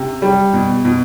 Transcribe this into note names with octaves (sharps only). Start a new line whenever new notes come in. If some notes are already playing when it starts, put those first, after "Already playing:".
Already playing: C3
G3
B2
B2